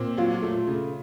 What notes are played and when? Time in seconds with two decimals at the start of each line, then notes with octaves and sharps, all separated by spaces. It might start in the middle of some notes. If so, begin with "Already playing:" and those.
Already playing: A#2 C4
0.17 F#3 F4
0.42 A3
0.67 C#3